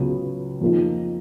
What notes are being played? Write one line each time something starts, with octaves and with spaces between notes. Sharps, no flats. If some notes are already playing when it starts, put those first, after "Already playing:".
Already playing: C#2 C#3 F#3 B3
F2 F3 A#3 D#4